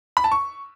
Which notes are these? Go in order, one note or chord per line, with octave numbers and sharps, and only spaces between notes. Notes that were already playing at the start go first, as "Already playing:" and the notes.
B5
A5
C#6